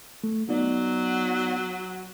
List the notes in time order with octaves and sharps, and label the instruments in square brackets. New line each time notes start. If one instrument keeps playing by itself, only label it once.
[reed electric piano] A3
[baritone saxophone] F#3 [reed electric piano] B3 D#4 D5